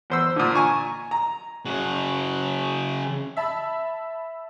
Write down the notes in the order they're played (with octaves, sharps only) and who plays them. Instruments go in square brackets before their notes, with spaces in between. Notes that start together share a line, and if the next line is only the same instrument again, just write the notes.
[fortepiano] E2 C5 E6
A#2 D3
G#5 A#5 C#6
A#5
[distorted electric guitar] C#3 F#4
[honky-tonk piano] E5 A5 B5